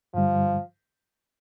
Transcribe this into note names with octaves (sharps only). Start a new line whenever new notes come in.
G2 D3 F3 G3